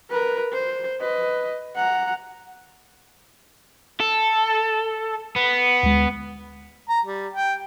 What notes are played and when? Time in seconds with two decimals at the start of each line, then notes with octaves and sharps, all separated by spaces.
0.10 A#4 B4
0.53 C5
1.01 B4 D#5
1.76 F#5 A#5
4.00 A4
5.36 B3
5.83 D2 G#3
6.89 A#5
7.05 G3
7.34 G5